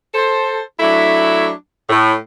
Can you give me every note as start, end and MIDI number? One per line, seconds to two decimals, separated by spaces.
0.14 0.60 69
0.14 0.60 72
0.80 1.48 54
0.80 1.48 57
0.80 1.48 62
0.80 1.48 64
1.89 2.13 45